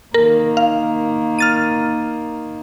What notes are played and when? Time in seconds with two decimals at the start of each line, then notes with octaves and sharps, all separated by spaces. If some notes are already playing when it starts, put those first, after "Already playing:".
0.14 D#3 A#3 A#4
0.57 F5
1.39 F6 A6 D#7